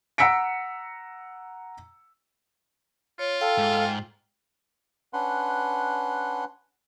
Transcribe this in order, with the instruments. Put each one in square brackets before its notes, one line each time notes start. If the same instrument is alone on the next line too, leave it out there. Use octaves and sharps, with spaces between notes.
[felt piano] F#5 A#5 E6 B6 C#7 D7
[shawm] F4 [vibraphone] C#5
[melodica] A4 F5 [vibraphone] G5
[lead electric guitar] G#2
[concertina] C#4 D4 B4 F#5 C6